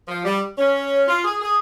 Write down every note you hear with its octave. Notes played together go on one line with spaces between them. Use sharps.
F3
G3
C#4
F4
G#4
G#4